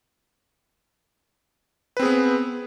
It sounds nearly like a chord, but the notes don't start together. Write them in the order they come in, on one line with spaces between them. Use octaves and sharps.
B4 C4 G#4 B3